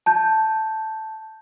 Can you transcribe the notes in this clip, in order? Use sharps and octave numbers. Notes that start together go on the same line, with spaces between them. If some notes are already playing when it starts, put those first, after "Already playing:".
A5 G6